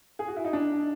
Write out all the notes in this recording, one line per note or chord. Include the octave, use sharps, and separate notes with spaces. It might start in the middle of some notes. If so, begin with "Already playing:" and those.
G#4
F#4
E4
D#4
D4